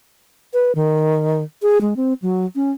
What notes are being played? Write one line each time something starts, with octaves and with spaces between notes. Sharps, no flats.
B4
D#3
G#4
G#3
C4
F#3
C#4